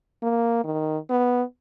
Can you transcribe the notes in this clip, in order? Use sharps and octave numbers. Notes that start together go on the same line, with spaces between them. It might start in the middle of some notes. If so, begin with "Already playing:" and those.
A#3
D#3
B3